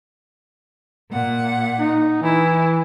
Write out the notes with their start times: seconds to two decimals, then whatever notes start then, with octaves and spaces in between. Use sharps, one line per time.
1.10 A#2 F#5
1.80 D#4
2.22 E3 E4